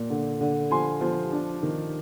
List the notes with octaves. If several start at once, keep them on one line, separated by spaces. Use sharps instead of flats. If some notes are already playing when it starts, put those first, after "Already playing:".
Already playing: A#2
D3
D3
F3 G#5 C6
F3
D4
D#3